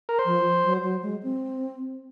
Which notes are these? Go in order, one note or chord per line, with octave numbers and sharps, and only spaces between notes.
A#4
C5
F3
F#3
F#3
G#3
C4